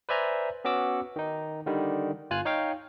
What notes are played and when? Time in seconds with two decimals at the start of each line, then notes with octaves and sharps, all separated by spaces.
0.09 B4 C5 D5 E5 G#5 A#5
0.65 B3 C#4 F#4 D6 E6
1.16 D#3 D#4
1.66 D3 D#3 G3
2.30 G1 F4 G#5 F#6
2.45 D#4 C#5 F5 G5